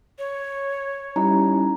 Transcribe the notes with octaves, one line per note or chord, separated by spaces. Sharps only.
C#5
G3 C#4 D#4 E4 A#5